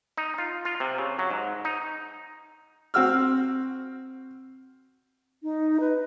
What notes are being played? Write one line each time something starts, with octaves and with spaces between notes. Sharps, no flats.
D#4
F4
F4
C3
C#3
F#3
G#2
D#4
C4 F#4 E6 F6
D#4
B4